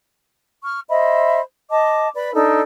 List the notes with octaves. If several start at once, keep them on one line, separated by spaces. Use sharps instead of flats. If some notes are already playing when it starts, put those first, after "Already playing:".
C#6 F6
C5 D#5 E5 B5
D#5 A5 D6
B4 D5 B5
D4 D#4 A4 E6